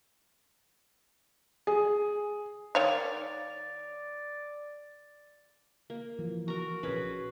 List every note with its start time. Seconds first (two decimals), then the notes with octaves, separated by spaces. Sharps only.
1.67 G#4
2.75 D#3 C#5 D5 F5
5.90 A#3
6.19 E3 F3
6.48 F#4 A#4 A#5
6.83 D#1 A#1 C#4 G#4 B4